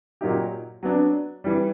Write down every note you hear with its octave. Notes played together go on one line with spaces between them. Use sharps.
A#2 F#3 A#3 D#4 G4
F#3 B3 D4
E3 G3